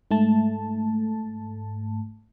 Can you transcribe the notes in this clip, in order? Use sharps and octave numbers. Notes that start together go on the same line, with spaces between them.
G#2 A3 A5